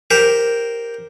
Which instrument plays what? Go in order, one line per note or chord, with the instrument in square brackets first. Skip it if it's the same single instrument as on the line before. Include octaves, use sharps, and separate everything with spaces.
[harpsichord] G4 A#4 C5